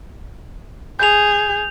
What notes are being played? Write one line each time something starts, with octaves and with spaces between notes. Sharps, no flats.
G#4 G6 F7